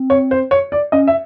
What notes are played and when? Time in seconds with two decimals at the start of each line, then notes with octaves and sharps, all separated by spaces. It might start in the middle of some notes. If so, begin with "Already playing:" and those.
Already playing: C4
0.10 C#5
0.31 C5
0.51 C#5
0.72 D5
0.92 C#4 D#5
1.07 E5